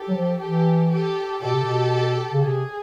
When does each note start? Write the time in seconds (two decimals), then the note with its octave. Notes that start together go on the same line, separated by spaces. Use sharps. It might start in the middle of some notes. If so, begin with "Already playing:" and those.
Already playing: G4 A4
0.08 F#3
0.15 F3
0.40 E3 G4 A4
0.91 G4 A4
1.42 B2 G4 A4
1.52 C3
1.64 B2
2.32 C#3
2.44 C3 G#4